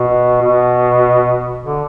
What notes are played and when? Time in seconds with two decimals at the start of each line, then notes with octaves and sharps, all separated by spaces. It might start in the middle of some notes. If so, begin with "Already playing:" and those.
Already playing: B2
0.42 B2
1.64 D3